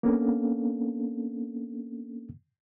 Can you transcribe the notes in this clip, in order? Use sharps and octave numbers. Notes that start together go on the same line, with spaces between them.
A#3 B3 C#4 D4 A4